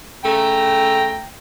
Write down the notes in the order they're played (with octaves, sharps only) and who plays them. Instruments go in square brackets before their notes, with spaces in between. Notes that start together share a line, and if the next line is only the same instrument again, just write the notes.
[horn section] C#3 A3 A#5 [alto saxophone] G5